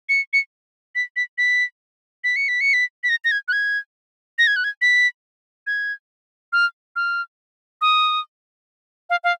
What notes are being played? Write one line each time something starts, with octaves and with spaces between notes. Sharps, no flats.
C#7
C#7
B6
B6
B6
B6
C#7
B6
C#7
B6
B6
A#6
A#6
G#6
F#6
G#6
A#6
G#6
F#6
G#6
B6
G#6
F6
F6
D#6
F5
F5